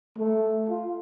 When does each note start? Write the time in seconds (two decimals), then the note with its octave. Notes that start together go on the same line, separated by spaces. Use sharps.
0.18 A3
0.68 F4